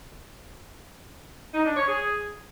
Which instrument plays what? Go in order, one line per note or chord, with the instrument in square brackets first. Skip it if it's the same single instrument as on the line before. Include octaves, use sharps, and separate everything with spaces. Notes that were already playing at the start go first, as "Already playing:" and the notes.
[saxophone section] D#4
D4
C#5
G#4